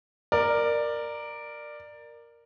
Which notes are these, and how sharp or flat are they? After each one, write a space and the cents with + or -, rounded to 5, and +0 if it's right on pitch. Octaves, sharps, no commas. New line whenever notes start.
A#4 +0 D5 +15